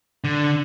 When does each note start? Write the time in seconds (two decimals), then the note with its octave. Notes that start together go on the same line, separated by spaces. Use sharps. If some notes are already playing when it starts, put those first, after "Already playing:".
0.24 D3